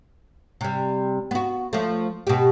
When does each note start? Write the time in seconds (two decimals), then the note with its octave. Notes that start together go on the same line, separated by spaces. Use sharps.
0.61 C3 G3
1.31 B3 F#4
1.73 F3 A3
2.27 B2 G4